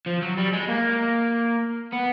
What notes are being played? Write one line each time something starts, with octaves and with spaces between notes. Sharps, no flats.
F3
F#3
G3
G#3
A#3
B3